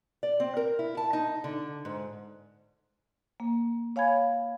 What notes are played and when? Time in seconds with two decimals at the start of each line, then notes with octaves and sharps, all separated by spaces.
0.23 D5
0.40 C4
0.57 A#4
0.79 E4
0.97 A5
1.13 D#4
1.44 D3
1.85 G#2
3.40 A#3
3.96 C#5 F5 G#5 B5 G#6